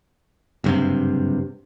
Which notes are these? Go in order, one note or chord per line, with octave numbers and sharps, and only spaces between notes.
F#1 G2 C3